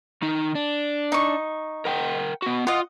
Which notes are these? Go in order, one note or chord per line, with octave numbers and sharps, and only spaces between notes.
D#3 D#4
D4
D#4 C#6
A#4 F#5 G5
B3 F#4
F4 D#5 F#5